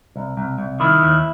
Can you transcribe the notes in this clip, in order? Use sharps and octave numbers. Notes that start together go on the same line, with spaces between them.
C2
C2
C2
D#3 E4
D#2